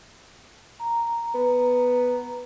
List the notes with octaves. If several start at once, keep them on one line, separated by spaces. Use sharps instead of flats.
A#5
B3